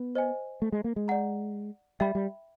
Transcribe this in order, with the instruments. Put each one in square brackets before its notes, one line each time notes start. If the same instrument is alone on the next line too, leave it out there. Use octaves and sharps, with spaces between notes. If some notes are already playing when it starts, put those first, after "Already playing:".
Already playing: [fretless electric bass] B3
[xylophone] C5 D#5 G#5
[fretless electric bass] A3
G#3
A#3
G#3
[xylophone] D5 F#5 A#5
[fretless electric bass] G3 [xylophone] E5 G5 B5
[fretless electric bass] G3